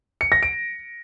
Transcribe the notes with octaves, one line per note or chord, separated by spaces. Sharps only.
C#7
A#6
D7